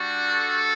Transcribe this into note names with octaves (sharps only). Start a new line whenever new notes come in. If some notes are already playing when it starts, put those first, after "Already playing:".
Already playing: G3 D4 F#4
A4